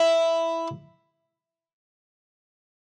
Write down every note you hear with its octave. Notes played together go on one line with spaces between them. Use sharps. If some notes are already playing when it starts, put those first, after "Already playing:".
Already playing: E4